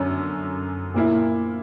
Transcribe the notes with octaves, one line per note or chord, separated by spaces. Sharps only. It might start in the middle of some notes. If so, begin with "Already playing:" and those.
Already playing: F#2 D3 C#4
A#2 A#3 E4